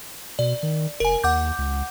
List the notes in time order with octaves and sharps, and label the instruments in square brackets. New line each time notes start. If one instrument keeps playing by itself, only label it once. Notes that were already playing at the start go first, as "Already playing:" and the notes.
[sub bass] B2 [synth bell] D5
[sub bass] D#3
[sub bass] F1 [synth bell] A#4 G#5
[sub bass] D#2 [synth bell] F#5 D6 G6
[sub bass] C#2